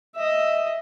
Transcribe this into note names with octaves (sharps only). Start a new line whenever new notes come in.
D#5 E5